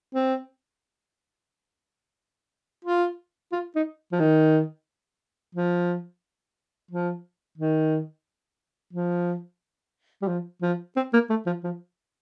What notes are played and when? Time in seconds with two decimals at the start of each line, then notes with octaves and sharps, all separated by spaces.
0.15 C4
2.85 F4
3.52 F4
3.75 D#4
4.12 F3
4.20 D#3
5.55 F3
6.91 F3
7.58 D#3
8.93 F3
10.22 G3
10.28 F3
10.62 F3
10.97 C4
11.13 A#3
11.30 A3
11.46 F3
11.64 F3